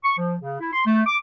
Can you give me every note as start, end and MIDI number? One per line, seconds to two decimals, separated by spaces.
0.04 0.14 85
0.18 0.36 53
0.41 0.59 49
0.60 0.73 64
0.73 0.86 84
0.86 1.02 57
1.07 1.16 86